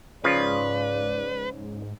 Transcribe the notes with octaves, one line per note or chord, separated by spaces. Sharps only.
G#2 C#3 F3 F4 B4 D5